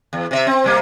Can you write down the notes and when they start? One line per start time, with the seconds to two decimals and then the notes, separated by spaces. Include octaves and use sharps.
0.13 E2
0.31 C3 D#5 E5
0.47 C4
0.64 C3 G3 A#3